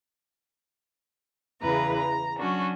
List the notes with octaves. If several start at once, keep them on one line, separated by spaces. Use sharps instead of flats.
E2 C#3 E3 B4 A#5
A#5
F#3 C#4 D4 F#4